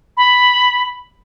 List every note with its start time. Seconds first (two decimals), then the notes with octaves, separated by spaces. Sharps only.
0.17 B5